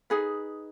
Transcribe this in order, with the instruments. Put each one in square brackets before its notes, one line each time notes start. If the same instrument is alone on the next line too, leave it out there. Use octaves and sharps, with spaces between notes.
[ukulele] D#4 G#4 B4